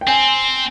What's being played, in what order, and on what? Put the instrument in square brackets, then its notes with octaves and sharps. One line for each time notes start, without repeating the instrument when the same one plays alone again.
[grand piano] G5
[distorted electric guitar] C4 [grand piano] G#5